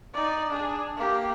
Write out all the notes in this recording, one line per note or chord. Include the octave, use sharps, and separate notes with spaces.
D#4 D5
D4 G#4
A#3 G4